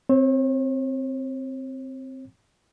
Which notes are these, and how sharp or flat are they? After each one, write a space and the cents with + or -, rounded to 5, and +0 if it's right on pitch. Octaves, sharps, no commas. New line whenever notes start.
C4 +0 C#5 -40